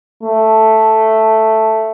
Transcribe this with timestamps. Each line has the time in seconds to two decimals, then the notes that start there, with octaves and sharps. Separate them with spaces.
0.23 A3